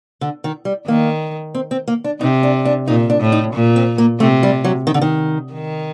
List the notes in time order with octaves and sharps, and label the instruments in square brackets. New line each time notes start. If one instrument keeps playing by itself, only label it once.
[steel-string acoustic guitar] D3
D#3
G3
[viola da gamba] D#3 [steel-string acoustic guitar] A#3
[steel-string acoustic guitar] C4
C4
A#3
D4
[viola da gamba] C3 [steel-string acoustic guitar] D#4
[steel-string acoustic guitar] D4
D4
[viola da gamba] A#2 [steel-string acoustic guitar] D#4
[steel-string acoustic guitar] D4
[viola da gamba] A2
[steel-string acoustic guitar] D#4
[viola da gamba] A#2
[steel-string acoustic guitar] C4
A#3
[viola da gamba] C3 [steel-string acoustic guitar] A3
[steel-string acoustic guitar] G3
F#3
D#3
D3
D#3
[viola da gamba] D#3